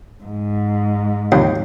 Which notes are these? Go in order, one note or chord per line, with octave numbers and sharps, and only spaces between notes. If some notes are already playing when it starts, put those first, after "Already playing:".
G#2
D#2